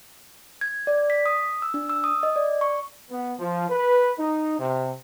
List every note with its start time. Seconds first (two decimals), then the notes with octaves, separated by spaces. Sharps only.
0.61 G#6
0.87 D5
1.10 B6
1.26 D#6
1.62 E6
1.74 D4
1.90 E6
2.04 D#6
2.23 D#5
2.36 D5
2.61 C#6
3.11 B3
3.39 F3
3.69 B4
4.19 D#4
4.60 C3